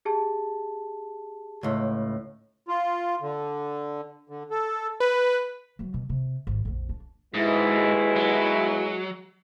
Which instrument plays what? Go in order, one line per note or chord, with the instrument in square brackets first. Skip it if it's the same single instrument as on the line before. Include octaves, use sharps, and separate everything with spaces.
[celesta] G4 G#4 A5
[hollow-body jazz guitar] C#2 A2
[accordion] F4
D3
D3
A4
[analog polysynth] B4
[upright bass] E3 F#3
B2
C3
G#1
A#1 F2
D4
[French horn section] D#2 B2 E4 [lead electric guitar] G#2 [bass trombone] G#3
[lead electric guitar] F#3